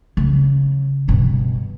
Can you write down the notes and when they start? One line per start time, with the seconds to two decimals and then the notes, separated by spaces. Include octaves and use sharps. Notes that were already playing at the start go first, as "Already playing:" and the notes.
0.17 C#3
1.08 G2 B2